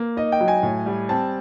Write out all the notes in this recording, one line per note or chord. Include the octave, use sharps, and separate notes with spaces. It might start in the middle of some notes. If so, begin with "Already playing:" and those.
Already playing: A#3
D#4 D#5
G5
F#3
G#5
A2
G3
C4 A5